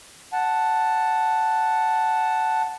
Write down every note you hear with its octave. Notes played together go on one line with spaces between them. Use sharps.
F#5 A5